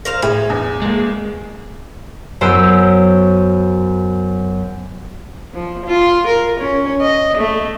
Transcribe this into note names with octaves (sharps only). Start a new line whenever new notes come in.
A#4 C5 F5
A2 G#4
E2
G#3 A#3
F#2 B3 C5 E6 D7
F3
F4
A#4
C#4
D#5
A3